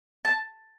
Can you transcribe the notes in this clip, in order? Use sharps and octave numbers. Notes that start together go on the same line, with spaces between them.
A5